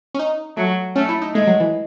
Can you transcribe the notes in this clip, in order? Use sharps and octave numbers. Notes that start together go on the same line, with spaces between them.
C#4
D#4
F#3 A3
A3 C#4
E4
D#4
G#3 A3
F#3
E3